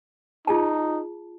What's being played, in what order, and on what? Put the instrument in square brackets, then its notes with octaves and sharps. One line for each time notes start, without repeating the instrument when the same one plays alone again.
[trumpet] D#4 [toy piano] F4 G#4 A5